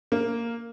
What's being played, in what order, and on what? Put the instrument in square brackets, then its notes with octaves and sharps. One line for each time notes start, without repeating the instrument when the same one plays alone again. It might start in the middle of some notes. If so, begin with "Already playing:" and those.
[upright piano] A#3